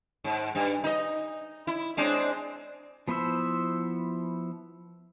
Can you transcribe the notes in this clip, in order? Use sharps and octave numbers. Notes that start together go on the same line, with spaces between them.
G#2
G2
D#4 D#5
E4
G#3 C4 D4
F3 B3 E4 C5 E5